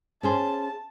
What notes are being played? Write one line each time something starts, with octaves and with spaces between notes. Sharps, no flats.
C#4 G#4 C5 A5